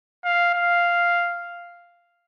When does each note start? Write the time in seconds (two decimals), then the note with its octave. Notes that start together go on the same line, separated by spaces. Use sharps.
0.25 F5
0.54 F5